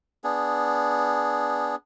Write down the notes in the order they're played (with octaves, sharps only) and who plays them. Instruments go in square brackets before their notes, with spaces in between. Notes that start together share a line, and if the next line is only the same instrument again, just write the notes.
[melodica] B3 D4 G#4